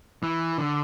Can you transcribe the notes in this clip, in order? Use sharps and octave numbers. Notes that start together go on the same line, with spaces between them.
E3
D3